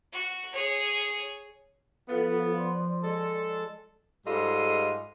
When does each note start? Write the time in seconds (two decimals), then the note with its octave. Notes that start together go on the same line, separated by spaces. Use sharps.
0.13 F#4
0.52 G#4 C#5
2.09 F3 B3 F4 A4 F5
2.57 D5 C6
3.03 G#3 A4
4.26 G#2 G3 F4 A4 D#5